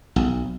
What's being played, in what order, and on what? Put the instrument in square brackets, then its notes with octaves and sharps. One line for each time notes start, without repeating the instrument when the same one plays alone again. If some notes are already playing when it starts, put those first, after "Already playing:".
[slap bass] B1